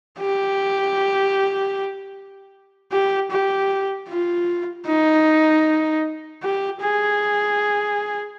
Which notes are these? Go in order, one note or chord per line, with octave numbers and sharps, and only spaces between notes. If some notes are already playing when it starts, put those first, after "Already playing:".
G4
G4
G4
F4
D#4
G4
G#4